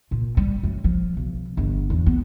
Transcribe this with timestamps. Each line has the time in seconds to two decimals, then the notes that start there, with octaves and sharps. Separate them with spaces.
0.11 A#2
0.37 G3
0.63 F#2
0.84 F3
1.17 B1
1.57 G1
1.90 E2
2.06 B3